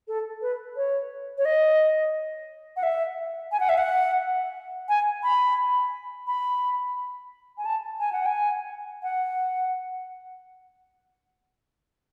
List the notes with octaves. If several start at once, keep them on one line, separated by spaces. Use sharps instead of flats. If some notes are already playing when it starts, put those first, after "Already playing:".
A4
B4
C#5
C#5
D#5
F#5
E5
G#5
F#5
E5
F#5
G#5
B5
B5
G#5
A5
G#5
F#5
G#5
F#5